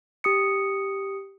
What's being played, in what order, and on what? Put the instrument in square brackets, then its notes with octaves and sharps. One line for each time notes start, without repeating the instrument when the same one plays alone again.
[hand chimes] G4 D#6 C#7